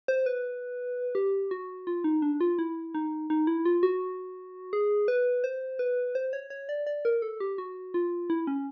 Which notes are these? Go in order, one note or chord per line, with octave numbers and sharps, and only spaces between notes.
C5
B4
G4
F#4
F4
D#4
D4
F4
E4
D#4
D#4
E4
F4
F#4
G#4
B4
C5
B4
C5
C#5
C#5
D5
D5
A#4
A4
G4
F#4
F4
E4
C#4